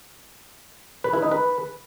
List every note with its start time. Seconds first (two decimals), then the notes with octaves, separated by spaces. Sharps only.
1.04 B4
1.13 E4
1.22 D#4
1.31 B4